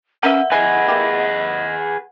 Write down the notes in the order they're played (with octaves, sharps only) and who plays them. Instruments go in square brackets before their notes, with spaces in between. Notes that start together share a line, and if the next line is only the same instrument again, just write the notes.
[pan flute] C#4 [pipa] A#4 B4 E5 [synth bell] F#5
[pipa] E4 G#5 [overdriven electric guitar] G#4 B4 [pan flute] D#5
[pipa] A#3 E4 G4